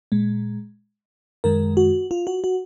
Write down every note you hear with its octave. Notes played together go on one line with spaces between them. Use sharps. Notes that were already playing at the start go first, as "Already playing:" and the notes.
A#2 G#3
F#2 D#3 G#3 A#4
F#4
F4
F#4
F#4